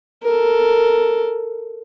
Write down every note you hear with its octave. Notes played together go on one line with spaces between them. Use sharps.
A4 A#4